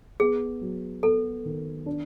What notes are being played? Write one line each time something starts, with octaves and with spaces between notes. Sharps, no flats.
B3 G#4
F#3
B3 A4
D#3
D4